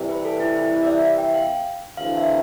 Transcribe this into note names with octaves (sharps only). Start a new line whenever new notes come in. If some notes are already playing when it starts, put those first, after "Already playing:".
Already playing: C3 E3 G3
B4
A4
E4
E4
D5
E5
E5
G5
F5
D2 C3 E3 A3 F5
E5